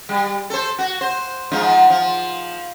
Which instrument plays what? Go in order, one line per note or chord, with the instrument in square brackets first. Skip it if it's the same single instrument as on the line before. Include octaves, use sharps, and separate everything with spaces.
[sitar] G3
A4 C5
F#4
C5
G#2 F3 D#4
F3